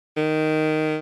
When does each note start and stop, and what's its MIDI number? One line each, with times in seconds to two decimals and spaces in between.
0.17 0.98 51